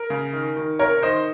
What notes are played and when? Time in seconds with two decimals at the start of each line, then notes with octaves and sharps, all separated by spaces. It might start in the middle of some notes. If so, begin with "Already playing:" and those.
Already playing: A#4
0.10 C#3
0.33 D#3
0.57 D#3
0.79 C3 A#4 C#5
1.03 D#3 C5 D#5